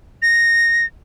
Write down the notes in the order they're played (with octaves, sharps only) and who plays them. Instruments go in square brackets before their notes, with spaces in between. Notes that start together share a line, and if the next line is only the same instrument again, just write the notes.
[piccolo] A#6